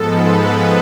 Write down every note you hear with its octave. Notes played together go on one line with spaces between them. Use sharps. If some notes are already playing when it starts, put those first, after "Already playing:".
Already playing: G#2 F3 G#3 B3 A4
B4